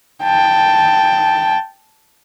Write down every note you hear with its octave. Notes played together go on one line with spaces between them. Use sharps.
G5 A5